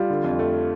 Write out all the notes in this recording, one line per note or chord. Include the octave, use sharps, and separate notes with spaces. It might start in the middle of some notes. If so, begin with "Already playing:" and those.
Already playing: G3 F4
D3
F2
A3